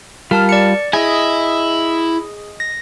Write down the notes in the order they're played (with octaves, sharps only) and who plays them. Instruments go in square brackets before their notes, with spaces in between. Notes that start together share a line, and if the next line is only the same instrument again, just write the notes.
[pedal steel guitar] G3 F4 [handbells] A#4 A5 F6
[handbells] D5 C#7
[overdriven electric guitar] E4 [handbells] G#4 [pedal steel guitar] D#5 G#5
[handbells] A#6